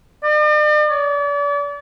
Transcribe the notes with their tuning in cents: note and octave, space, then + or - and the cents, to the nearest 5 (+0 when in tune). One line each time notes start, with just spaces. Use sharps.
D5 +45
D5 -40